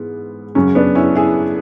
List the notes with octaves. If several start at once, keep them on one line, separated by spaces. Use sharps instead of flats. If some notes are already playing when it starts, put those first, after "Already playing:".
Already playing: G#2 E3 B3
F#2 C#3 F#3 C#4
B3 D4
C#4 E4
E4 G#4